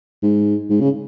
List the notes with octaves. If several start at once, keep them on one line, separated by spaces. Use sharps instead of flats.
G#2
G#2
C#3